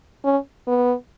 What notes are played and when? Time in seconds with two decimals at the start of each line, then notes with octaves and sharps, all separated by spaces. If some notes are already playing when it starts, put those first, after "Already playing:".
0.24 C#4
0.68 B3